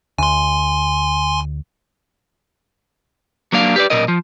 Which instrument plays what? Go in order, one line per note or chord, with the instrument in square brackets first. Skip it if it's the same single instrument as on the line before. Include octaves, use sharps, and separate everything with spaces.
[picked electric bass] D2 [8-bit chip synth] G#5 C6
[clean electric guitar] F#3 A#3 D4 F5
G4 B4 D5
B1 A#2 A#4 D#5
F3